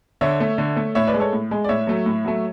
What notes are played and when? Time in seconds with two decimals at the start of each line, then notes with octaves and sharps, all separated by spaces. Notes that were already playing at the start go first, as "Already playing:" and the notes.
0.21 D3 C#5 E5
0.40 A3
0.58 D3
0.76 A3
0.95 A2 C#5 E5
1.07 B4 D5
1.14 G#3
1.20 A4 C#5
1.33 A2
1.51 G#3
1.64 D5
1.69 A2 C#5 E5
1.87 F#3 A3
2.06 A2
2.25 F#3 A3